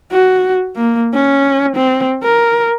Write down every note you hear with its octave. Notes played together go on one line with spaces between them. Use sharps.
F#4
A#3
C#4
C4
A#4